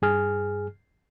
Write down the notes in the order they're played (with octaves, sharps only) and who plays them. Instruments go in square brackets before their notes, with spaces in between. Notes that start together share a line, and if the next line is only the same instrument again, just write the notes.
[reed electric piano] G2 G#4 F6